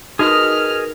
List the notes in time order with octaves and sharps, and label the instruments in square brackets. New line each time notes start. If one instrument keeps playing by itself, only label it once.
[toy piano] D#4 F#4 [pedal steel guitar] G#4 D#5 D#6 [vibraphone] A#4 B4 [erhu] F6